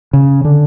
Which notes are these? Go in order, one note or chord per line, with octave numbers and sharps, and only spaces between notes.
C#3
D3